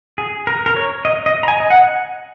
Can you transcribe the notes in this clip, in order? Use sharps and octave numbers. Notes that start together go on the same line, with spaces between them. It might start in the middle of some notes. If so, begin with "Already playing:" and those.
G#4
A#4
A#4
C#5
D#5
D#5
A#5
G#5
D#5
F#5